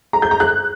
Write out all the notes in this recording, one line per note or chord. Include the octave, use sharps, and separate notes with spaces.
A#5
G6
A#5
F#6